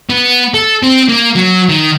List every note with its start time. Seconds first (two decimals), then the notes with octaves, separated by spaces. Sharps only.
0.10 B3
0.54 A4
0.83 C4
1.09 A#3
1.36 F#3
1.69 D#3